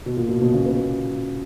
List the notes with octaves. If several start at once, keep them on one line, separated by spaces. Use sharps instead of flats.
B2
A#2
B2
B2
C#3
B3